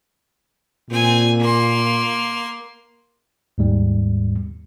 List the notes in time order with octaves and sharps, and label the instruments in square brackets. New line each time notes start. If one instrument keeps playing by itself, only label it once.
[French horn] A#2 [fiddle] C4 G#5
[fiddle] A#3 C6
[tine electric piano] D#2 G#2 G3